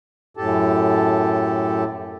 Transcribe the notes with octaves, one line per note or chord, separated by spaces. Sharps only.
F#2 A2 G4 A4 A5